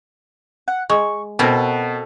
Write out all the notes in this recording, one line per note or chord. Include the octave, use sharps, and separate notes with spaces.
F#5
G#3 C#6
B2 C4 E4 F#4 A4 A#4